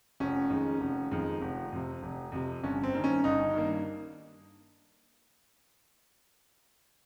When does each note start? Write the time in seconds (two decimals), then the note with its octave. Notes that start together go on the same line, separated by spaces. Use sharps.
0.20 F1 C#4
0.50 F2 D#3 G#3
0.81 F1
1.11 F2 D#3 G#3
1.42 F1
1.72 F2 C3
2.03 F1
2.32 F2 C3
2.63 G1 C#4
2.83 C4
2.93 G2 D#3 A#3
3.04 C#4
3.24 G1 D#4
3.54 G2 D#3 A#3